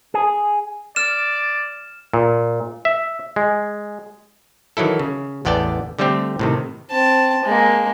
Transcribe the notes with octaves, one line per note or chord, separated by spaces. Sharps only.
G#4
D5 F6 E7
A#2
E5
G#3
D#3 E3 F#3 E4 A4
C#3
A1 E2 B3 D5 G5 A5
D3 G3 A3 C4 G4
A2 C3 D#3
C4 A5
G#3 A#3